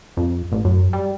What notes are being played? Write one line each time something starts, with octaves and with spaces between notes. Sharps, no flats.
F2
A1
F#2
G3